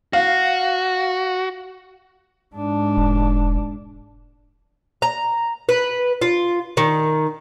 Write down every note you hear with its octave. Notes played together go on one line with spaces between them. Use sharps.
F#4 F5
G#2 D4
E1
A#5
B4
F4
D#3